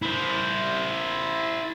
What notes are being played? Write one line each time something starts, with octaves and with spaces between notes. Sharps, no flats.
E4 C5